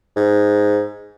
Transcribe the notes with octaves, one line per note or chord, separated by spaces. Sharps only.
G#2